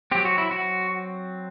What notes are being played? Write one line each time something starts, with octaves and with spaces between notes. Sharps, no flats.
F#3 C4 G4
F#4
E4
F#4